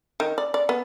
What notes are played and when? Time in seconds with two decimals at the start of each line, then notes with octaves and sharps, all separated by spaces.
0.20 D#3
0.38 D5
0.54 D5
0.69 B3